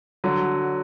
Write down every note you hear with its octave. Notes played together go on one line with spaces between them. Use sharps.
D3 F#3